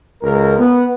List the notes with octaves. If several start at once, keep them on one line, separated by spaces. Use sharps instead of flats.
C#2 A#4
B3